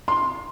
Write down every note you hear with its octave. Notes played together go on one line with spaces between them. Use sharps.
C6